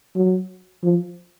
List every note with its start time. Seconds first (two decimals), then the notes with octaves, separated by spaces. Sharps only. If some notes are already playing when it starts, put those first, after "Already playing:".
0.16 F#3
0.83 F3